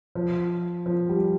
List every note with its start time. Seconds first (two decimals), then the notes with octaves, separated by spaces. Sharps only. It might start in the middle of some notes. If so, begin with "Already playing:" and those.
0.15 F3
0.86 F3
1.09 G3